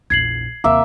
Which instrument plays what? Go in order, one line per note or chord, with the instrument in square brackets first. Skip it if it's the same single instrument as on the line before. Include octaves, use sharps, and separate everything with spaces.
[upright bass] A#1 E2 [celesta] G#6 C7 F#7
[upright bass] D#2 C3 [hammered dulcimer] A#3 E5